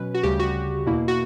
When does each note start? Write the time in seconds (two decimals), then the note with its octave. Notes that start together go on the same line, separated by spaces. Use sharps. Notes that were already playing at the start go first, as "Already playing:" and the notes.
Already playing: B2 F#3 C#4 B4
0.14 F#4
0.23 D2 C#3 G3 G4
0.39 F#4
0.86 E2 B2 A#3 E4
1.08 F#4